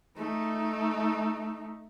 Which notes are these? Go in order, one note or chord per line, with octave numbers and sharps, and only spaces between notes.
A3 D#4